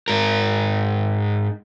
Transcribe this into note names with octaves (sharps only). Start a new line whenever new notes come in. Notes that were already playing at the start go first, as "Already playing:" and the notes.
G#2 A#4